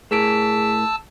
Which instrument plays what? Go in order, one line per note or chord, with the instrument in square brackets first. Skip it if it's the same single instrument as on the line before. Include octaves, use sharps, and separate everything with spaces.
[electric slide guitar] A2 A#4 [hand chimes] G#4 B6 D7 [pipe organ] A5 E6